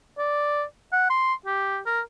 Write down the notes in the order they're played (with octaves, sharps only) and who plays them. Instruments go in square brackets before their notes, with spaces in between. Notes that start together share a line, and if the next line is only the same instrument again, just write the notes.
[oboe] D5
F#5
C6
G4
A#4